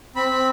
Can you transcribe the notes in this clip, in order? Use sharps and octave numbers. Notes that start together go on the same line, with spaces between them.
C4 B5
C4